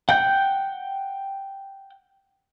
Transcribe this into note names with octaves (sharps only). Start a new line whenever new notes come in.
F#5 G5 G6